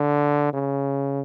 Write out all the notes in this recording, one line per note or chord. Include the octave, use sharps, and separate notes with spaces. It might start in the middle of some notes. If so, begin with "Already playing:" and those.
Already playing: D3
C#3